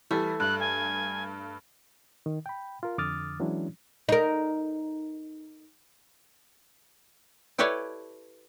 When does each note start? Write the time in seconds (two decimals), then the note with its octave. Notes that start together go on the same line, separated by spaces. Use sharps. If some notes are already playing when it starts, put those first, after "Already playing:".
0.11 E3 G3 A3
0.40 G2 F#6
0.60 G#5
2.26 D#3
2.46 G5 B5
2.83 F4 A#4
2.98 F2 D3 D6 D#6 F6 A6
3.40 E3 F#3 G#3 C#4 D4 E4
4.09 D#4 A#4
7.58 E4 G4 A4 B4 C#5 D5